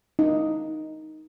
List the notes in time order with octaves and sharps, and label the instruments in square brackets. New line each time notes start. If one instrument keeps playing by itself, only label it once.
[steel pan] D#4